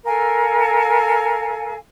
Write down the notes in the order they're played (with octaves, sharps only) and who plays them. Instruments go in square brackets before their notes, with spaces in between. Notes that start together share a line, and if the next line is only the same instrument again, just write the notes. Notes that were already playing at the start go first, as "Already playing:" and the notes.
[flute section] A4 A#4 F5 G#5